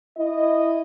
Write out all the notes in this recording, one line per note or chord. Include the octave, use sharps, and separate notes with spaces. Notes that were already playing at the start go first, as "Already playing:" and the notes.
E4 D#5